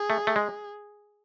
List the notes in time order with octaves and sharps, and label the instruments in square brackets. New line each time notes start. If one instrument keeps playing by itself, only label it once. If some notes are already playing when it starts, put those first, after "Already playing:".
Already playing: [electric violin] G#4
[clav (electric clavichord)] A3
A3
G#3